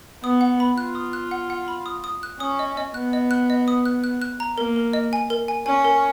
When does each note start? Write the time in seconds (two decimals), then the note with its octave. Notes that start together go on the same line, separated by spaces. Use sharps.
0.23 B3 D#6
0.41 F#5
0.60 B5
0.78 F4 F#6
0.95 D#6
1.13 F#6
1.31 F#5
1.50 F#5
1.68 B5
1.86 D#6
2.04 D#6
2.23 F#6
2.40 C#4 D#6
2.59 D#5
2.77 D#5
2.94 B3 F#6
3.13 D#5
3.31 F#6
3.50 D#5
3.68 D#6
3.86 F#6
4.04 F#6
4.22 F#6
4.40 A#5
4.58 A#3 A#4
4.76 A#4
4.93 D#5
5.13 G#5
5.30 A#4
5.48 G#5
5.66 C#4 G#5
5.85 A#4